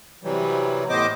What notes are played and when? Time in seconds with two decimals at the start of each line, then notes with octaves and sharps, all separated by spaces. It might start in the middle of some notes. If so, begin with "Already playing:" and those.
0.23 C3 E3 F#3 G3
0.89 A2 B3 C5 D#5 D6